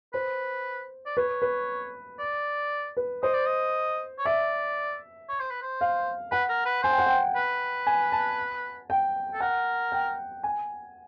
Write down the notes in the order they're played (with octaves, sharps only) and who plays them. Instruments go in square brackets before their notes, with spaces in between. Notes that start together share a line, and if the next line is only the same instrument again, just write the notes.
[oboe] B4 [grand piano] C5
[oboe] D5
[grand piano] B4 [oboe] C#5
[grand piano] B4
[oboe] D5
[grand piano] B4
[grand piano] C5 [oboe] D#5
[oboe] D5
D#5
C#5
[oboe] D5 [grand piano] E5
[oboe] C#5
C5
B4
C5
[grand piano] F5
[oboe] B4 [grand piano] F#5
[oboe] A#4
B4
[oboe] C5 [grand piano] G#5
[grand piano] G5
F#5
G5
[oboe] B4
[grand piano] G#5
A5
G5
[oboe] A4
[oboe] A#4 [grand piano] F#5
[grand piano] G5
G#5